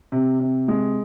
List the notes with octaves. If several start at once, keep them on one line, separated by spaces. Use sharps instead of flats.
C3
C3
G#3